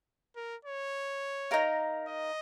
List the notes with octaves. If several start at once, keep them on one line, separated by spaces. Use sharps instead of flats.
A#4
C#5
D#4 A#4 F5 A#5
D#5